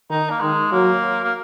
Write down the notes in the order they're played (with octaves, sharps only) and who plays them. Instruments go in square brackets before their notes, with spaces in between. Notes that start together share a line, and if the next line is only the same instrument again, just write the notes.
[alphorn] D#3 [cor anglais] D#4
[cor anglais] A#3
[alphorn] D#3 [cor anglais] G#3
[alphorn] F#3 [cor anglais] A#3
[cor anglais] A#3